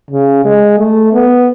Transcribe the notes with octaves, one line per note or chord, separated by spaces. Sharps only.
C#3
G#3
A3
B3